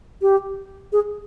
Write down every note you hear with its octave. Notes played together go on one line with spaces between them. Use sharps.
G4
G#4